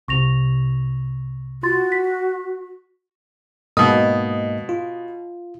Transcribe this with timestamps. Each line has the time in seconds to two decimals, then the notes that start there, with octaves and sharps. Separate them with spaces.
0.08 C2 C3 C#6 A#6 F7
1.63 F4 F#4 C6 A6
1.92 B6
3.77 G#2 B2 A#3 D#5 D#6
4.69 F4